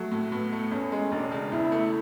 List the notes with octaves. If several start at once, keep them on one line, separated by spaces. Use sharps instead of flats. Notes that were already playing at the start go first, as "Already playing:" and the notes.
Already playing: F#3 A3
A2
A2 B3
A3
E2 C#4
G#3
E1 D4
C#3
E2 E4
A3